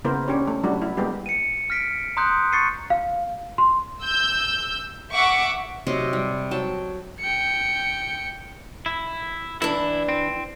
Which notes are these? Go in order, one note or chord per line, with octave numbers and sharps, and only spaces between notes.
C#3 A#3 B3 E4 A#4 C5
C#4 D4 G4 C#5
A3
F#3 G3 A3 D4 E4 F#4
E4
G3 G#3 A#3 B3 G4
C#7 D#7
F6 A#6 B6 D7
A#5 C6 D#6 F#6 G6
C#6 A6 C7 C#7 D#7
F5
C6
E6 G6
E5 F#5 C#6 D6
C3 F#3 C5 D#5
G3
F#3 G5 A5
G5 C#7
E4
E3 D4 E4
C4